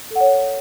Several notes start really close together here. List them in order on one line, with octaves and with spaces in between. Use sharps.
A4 F#5 C#5